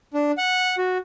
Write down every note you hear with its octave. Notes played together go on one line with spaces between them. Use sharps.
D4
F#5
F#4